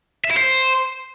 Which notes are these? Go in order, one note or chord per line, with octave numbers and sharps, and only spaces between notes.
E5
E4
C5